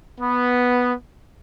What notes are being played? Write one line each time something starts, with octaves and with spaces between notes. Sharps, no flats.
B3